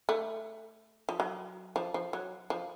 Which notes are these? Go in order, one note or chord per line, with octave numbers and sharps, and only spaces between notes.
A3
F3
F#3
F3
F3
F#3
F3